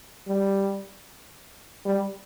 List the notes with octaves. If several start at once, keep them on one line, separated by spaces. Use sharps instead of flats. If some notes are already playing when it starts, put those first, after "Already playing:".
G3
G3